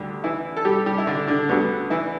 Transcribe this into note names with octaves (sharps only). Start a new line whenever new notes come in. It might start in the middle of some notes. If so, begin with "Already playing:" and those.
Already playing: D2 D3 G3 G4
E3 E4
A4
G3 G4
G3 G4
E4
D3 D4
D3 D4
D2 D3 G3 B3
E3 E4